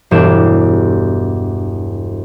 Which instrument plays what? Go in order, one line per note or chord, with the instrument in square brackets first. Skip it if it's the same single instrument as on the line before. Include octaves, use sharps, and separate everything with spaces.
[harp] E1 G2 G4 E7